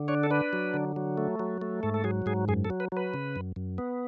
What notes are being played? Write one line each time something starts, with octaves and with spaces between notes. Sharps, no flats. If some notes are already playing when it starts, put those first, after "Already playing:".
Already playing: D3
D4 C#5
A4
D4 B4
F#3
D3
F#3
A3
F#3
A3
G#2 A4
A4
F#3 G#4
G#2 G#4
F#2 G#4
A4
F#3
B4
F#3 B4
C#3
F#2
F#2
B3